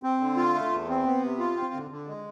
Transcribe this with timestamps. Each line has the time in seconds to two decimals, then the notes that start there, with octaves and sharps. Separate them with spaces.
0.03 C4
0.20 D3
0.37 F4
0.55 A3
0.71 E2
0.89 C4
1.06 B3
1.23 C3
1.39 F4
1.57 C4
1.74 D3
1.91 D3
2.08 G#3